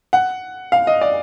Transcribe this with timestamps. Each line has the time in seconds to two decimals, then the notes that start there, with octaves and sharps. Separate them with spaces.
0.13 F#5
0.72 F5
0.87 D#5
1.01 D5